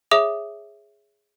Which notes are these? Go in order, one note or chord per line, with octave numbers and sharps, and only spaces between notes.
G#4 C#5 E5 D6 D#6 F7